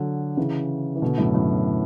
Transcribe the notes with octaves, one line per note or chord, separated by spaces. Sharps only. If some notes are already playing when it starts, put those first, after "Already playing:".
Already playing: D3 F#3
C#3 E3
E3
B2 D3
F#2 A2
F#2 A2